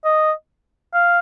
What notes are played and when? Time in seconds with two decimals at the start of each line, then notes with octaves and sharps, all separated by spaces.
0.05 D#5
0.94 F5